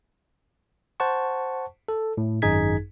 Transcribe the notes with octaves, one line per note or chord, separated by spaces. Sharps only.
C5 F#5 A5 C#6
A4
A2
G#1 F#2 D#4 G#4 G#6 B6